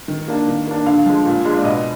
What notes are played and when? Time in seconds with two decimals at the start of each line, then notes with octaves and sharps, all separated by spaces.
0.08 D#3
0.28 A#3 D4
0.48 D#3
0.67 A#3 D4
0.86 D3 F5
1.06 F3 G#3
1.26 A#2
1.45 G#3 D4
1.57 D5
1.64 B2 D#5